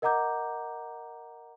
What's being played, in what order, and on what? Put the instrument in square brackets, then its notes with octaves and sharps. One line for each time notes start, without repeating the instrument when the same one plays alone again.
[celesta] A#4 D#5 F#5 A#5 D6 G6